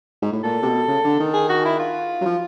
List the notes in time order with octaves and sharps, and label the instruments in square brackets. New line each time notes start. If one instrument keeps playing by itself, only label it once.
[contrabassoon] G#2
A2
[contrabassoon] A#2 [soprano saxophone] A4
[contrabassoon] C3
B2
C#3
D3
D#3
[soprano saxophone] G#4
F#4
E4
F4
[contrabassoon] F#3
F3